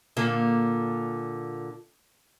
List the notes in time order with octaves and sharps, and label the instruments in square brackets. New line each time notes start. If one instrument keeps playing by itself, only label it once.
[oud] A#2 D3